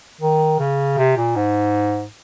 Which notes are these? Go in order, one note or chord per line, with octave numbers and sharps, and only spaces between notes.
D#3
C#3
C3
A#2
G#2